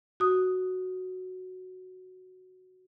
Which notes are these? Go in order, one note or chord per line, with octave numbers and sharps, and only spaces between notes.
F#4 D#6